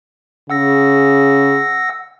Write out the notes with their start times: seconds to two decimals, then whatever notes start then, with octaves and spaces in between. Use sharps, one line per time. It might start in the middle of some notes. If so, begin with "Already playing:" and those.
0.50 C#3 F#5 E6 A#6